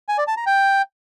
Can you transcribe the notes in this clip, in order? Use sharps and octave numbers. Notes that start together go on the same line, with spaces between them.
G#5
D5
A5
A#5
G5